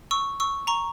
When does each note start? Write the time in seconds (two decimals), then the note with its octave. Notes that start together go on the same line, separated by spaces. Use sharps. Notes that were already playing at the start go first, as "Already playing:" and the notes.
0.11 C#6 E6
0.40 C#6 E6
0.67 A#5 C#6